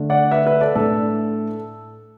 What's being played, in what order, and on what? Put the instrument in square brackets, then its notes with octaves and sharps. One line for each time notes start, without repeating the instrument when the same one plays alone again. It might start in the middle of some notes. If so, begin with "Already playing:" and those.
Already playing: [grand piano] D3 A3 D4
D5 F#5
B4 E5
B4 E5
A4 D5
A2 A3 D4 A4